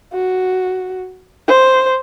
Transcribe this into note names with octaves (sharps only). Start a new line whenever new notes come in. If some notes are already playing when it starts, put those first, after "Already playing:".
F#4
C5